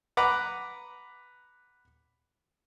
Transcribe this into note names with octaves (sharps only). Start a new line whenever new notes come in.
B4 F#5 A#5 D6